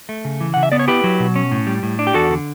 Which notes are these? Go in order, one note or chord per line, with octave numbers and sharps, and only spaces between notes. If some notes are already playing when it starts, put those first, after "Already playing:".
A3
C#3
E3
C#3 F#5
E5
B3 D5
C#5
E4 G4 B4
F#3
B2
C#4
A2
G3
A2
D4
G4
E2 F#4 A4
D3